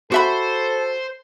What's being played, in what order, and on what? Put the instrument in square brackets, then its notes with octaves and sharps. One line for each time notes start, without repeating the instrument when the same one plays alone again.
[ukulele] F#4 E5 B5 [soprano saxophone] A4 [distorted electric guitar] C5